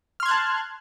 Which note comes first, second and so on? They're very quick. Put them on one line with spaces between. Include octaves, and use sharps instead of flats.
F6 C6 G#6 F#6 A5